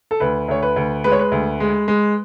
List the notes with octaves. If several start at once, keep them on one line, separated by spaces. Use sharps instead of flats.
A4
D2 B4
D2 C#5
B4
D2
G#3 B4
C#5
B4
D2
G#3
G#3